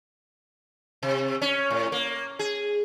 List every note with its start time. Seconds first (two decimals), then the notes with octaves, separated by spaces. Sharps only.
1.03 C3
1.42 C#4
1.70 A2
1.92 A#3
2.39 G#4